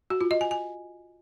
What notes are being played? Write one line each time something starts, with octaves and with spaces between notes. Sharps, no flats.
F#4
F4
D#5
G#5
G#5